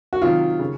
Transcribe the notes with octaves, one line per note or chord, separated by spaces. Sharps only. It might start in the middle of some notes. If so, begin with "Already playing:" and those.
F#4
C3 D#3 F#3 F4
C#3